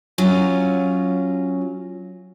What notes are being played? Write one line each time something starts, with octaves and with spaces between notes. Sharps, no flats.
F#3 C#4 F4